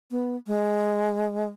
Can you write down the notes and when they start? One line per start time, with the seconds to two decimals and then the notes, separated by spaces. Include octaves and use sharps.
0.11 B3
0.47 G#3